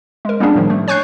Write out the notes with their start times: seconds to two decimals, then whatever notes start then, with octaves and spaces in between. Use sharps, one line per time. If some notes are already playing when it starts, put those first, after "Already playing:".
0.25 G#3 A#4
0.40 G3 A#3 B3 C#4 D4 G#4
0.55 A2 D#3 F3
0.70 A3
0.88 C#5 G#5 C#6 F#6 G6 C7